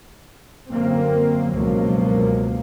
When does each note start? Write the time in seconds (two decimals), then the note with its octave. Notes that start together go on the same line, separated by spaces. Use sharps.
0.68 F#2 D3 A#3 C4
1.52 C#2 G2 B2 F3 F#3 A#3